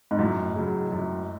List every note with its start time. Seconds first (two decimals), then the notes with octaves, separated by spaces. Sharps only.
0.11 G#2
0.19 F#2 A2
0.56 C#3 F#3
0.92 F#2